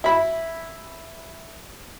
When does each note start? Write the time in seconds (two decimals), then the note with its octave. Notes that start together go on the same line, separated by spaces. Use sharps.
0.04 E4 B5